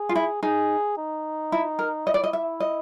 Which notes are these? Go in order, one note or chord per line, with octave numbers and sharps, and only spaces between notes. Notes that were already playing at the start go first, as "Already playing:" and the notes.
Already playing: G#4
F4
E4
D#4 G#4
D#4
E4
A#4
E4 D#5
D5
D#5
E5
D#5